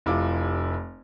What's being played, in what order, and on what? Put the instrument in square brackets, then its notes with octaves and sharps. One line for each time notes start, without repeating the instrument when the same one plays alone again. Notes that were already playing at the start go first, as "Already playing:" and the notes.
[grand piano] F1 E4 F4 D6